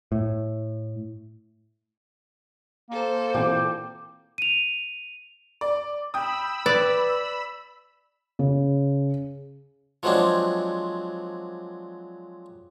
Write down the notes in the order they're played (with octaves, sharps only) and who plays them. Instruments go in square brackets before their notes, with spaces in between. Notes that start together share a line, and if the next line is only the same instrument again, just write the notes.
[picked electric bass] A2
[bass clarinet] A#3 [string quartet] A4 C5
[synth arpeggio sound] A#2 E3 C4 [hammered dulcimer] G4
[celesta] D#7 F7
[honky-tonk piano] D5
[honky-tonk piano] G5 D#6 [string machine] B5 E6
[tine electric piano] B4 [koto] D5
[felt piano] C#3
[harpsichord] F3 F#3 G#3 C4 D4